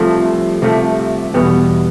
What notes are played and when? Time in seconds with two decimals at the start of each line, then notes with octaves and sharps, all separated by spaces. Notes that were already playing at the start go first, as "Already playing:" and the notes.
Already playing: C2 C3 F3 A3
0.61 C2 C3 F3 A3
1.34 E2 B2 G3 B3